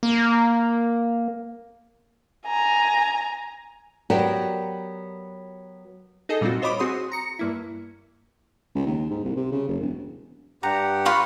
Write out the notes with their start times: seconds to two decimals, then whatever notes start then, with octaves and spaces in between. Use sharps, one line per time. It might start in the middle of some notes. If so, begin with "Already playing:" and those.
0.03 A#3
2.46 G#5 A#5
4.10 F#3 B3 F#4 G4 A#4 D5
6.29 D#4 G#4 A4 D#5
6.41 A#2 G3 C4 D#4 F4 F#4
6.62 F4 C5 C#5 D#5 B5 D6
6.79 C4 F#4 G#4 C6 D#6
7.12 A#5 C#7
7.39 G2 A#3 E4
8.75 C#2
8.87 D#2
9.11 G#2
9.24 C2
9.37 C3
9.52 C#3
9.69 F#1
9.80 E1
10.63 G2 G4 F#5 A#5
11.05 F4 B5 C#6